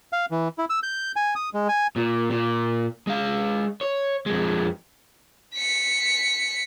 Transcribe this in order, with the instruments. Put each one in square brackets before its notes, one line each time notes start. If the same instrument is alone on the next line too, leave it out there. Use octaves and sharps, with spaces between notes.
[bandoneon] F5
E3
E4
E6
G6
G#5
D#6
G#3
G#5
[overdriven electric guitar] A#2
A#2
G#3 F5
C#5
F2 G#3
[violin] B6 C#7